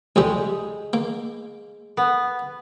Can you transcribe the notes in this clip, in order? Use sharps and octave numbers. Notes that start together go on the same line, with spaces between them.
C2 F2 G3 G#3
A#3
B3